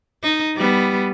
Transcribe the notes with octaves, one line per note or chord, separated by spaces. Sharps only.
D#4
G3 B3